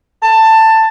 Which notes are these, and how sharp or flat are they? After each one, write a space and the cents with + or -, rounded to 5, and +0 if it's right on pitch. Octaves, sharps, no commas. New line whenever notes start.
A5 +15